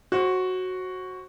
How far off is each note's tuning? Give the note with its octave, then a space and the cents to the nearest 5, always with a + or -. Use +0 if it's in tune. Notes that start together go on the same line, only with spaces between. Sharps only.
F#4 +0 C5 +30